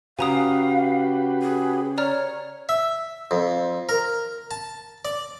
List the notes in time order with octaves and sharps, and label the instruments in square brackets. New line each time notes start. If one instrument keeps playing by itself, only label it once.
[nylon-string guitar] C#3 [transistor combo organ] F#4 G4 B4 [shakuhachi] F5 [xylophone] G#5 A#5 D#6
[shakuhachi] G#4
[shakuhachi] C#5 [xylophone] D5 A#5 F6
[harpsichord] E5
F2
A#4
A5
D5